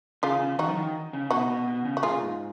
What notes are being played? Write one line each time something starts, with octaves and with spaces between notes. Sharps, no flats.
C#3 F4 G#4
C#3
D#3 D#4 F#4
F3
D#3
C#3
B2 D#4 F#4
B2
B2
C#3
F#4
A#2 F4 G#4
G#2